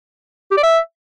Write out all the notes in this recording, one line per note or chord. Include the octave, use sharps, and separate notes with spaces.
G4
D5
E5